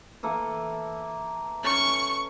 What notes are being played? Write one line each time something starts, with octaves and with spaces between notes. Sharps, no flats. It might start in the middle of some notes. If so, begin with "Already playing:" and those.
E3 A#3 A4
C#4 A4 C#6